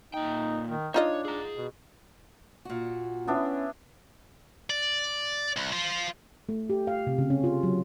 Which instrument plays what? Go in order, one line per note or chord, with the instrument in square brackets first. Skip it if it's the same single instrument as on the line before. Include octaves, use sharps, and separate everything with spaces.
[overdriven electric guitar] A#2 G5 [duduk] D#4
[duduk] D#3
[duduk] D4 [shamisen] D#4 F4 D#5 [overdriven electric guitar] C#5
[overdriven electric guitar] G#4 A#5
[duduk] B2
[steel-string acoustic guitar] A#2 F#4
[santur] B3 D4 E4 [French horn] C#4
[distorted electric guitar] D5
C2
F4 C5
[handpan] A3
G4
F5
C3
C#3
C#4
F4
F#3